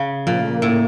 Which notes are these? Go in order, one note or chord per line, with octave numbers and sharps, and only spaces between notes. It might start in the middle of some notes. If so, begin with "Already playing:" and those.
Already playing: C#3
A#2 F3
A3
A#3
A2